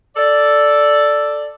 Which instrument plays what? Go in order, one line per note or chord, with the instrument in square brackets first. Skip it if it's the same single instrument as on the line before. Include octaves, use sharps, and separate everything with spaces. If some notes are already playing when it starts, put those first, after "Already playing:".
[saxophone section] A4 D5